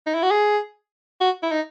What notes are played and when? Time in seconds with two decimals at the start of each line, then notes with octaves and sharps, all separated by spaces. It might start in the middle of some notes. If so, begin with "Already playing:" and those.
0.07 D#4
0.15 E4
0.23 F#4
0.31 G#4
1.21 F#4
1.43 E4
1.52 D#4